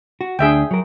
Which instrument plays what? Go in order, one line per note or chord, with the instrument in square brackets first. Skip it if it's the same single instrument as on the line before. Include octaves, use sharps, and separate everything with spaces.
[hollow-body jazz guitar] F#4
[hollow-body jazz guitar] D2 D4 [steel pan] G#4 E5 G5
[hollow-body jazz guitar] F#3 A#4